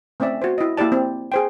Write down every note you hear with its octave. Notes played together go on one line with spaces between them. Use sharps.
A3 C4 C#4 D5 E5
F#4 C5
E4 D#5
A#3 E4 G4 D5 A5
C4
G#4 C5 G5